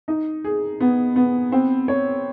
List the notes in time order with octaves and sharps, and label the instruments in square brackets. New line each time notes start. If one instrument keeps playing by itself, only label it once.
[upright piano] D#4
G#4
B3
B3
C4
C#5